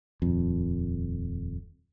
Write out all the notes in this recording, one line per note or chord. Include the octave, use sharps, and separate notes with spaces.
D#1 F2